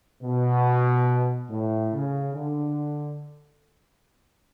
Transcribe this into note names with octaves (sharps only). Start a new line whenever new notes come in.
B2
A2
C#3
D3